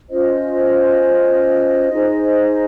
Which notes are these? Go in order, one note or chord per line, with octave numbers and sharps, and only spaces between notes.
C#4 F4 C5 D#5
D#4 G#4 C5